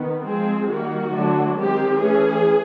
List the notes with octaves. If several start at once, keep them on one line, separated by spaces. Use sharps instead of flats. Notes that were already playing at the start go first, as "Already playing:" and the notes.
Already playing: D#3 B3
F3 G#3 C4 G#4
D#3 G3 A#3 F#4
D3 F#3 A3 D4
D#3 G#3 C4 G4
E3 A3 C#4 G#4